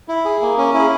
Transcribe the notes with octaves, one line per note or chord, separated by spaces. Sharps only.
E4
G#4
A#3
C#4
E4
G#4